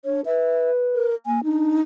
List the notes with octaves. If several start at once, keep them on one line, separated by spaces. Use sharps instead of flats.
D4 C#5
B4 E5
A#4
A#3 G#5
D4 D#4